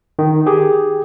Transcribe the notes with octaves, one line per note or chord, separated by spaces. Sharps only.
D#3
G4 G#4